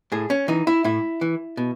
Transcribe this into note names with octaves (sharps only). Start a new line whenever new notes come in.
A2 G#4
C#4
E3 D#4
E4
A2 E4
E3
B2